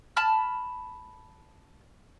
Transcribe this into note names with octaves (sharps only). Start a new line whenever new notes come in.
A5 B5 F6